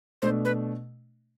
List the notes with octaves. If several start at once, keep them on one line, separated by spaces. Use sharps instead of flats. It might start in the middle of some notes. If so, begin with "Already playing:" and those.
B2 A3 D4 C5
B4